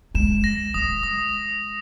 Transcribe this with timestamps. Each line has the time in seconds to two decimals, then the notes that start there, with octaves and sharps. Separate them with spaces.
0.15 G#3 E7
0.44 A#6
0.74 G#3 D#6
1.03 D#6